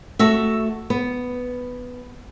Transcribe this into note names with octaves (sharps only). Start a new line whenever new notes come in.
A3 F#4 E5
B3